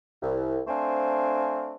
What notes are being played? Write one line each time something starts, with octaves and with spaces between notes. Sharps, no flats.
C2
A3 C4 D4 C5 F5 G#5